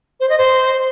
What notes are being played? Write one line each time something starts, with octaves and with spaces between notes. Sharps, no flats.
C5
D#5
C5